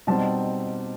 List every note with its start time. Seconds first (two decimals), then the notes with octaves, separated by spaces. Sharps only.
0.07 B2 G3 C4 D#4 A5